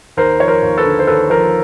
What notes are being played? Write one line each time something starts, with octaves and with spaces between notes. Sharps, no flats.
D#2 A#4 C5
F3 C#5
A#4 C5
D#2
A4 B4
D3
C5
D#2 A4 B4
F3 A#4 C5